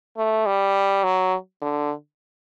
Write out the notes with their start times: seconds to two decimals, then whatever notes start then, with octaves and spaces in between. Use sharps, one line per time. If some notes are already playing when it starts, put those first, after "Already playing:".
0.18 A3
0.46 G3
1.04 F#3
1.62 D3